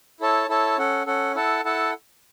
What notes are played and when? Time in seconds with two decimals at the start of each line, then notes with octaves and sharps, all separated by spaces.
0.20 E4 A4 C#5 A5
0.48 E4 A4 C#5 A5
0.78 C#4 A4 F#5
1.06 C#4 A4 F#5
1.35 E4 A4 F#5 A5
1.64 E4 A4 F#5 A5